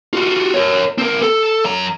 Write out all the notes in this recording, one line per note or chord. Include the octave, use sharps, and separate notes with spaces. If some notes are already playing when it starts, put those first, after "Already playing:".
F4 F#4
A#4 C#5
C4 A#4
A4
F#2 A#5